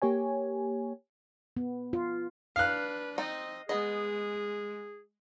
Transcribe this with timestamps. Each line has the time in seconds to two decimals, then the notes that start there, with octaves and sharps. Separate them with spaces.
0.02 A#3 G4 C#5 G#5
1.57 B3
1.93 F4
2.56 D4 B4 F5 F#6
3.18 C4 D#4 D#5
3.69 G#3 B3 G#4 D#5